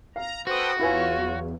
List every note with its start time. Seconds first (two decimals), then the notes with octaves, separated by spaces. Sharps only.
0.16 F5 A#5
0.47 F#4 A4 B4 C5 G5 D#6
0.79 E2 E4 F4 B4 C#5 G#5
1.19 F#3